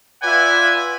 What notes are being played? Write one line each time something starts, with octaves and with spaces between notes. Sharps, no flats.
F4 B4 D5 E5 F#5 G#5